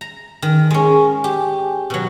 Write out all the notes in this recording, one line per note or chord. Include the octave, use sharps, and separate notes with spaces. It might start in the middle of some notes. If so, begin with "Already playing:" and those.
A#5
D#3
G#3 C#4
G4
B2 F#3